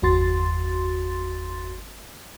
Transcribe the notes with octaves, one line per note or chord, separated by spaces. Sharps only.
G1 E2 F#4 C6 A6